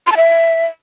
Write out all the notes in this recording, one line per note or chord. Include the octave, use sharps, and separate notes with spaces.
C6
A5
E5